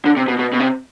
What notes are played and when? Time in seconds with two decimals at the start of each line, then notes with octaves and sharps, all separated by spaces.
0.06 D3
0.17 C3
0.28 B2
0.39 B2
0.53 B2
0.60 C3